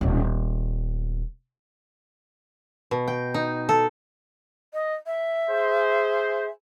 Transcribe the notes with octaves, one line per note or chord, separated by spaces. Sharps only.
D#1 B3
B2
G5
D#4
A4
D#5
E5
G#4 C5